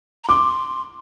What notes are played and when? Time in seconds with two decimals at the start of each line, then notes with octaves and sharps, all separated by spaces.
0.24 A#5
0.28 C6 D6